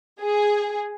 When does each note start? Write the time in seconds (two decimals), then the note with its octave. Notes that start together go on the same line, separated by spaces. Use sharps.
0.21 G#4